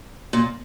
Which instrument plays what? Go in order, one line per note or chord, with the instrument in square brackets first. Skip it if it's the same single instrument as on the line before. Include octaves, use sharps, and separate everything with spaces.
[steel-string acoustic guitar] A#2